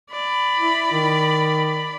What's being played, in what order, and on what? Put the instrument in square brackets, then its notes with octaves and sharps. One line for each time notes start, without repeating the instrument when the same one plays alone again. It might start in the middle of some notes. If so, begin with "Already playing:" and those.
[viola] D5 B5
[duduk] E4
D#3